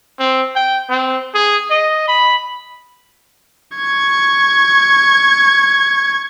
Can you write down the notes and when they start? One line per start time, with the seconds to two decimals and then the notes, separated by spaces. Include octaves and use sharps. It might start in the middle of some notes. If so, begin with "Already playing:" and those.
0.19 C4
0.55 G5
0.90 C4
1.34 G#4
1.70 D#5
2.08 B5
3.76 C#6 G#6